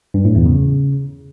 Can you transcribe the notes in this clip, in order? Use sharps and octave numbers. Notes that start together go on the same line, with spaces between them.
G2
A2
E2
C#3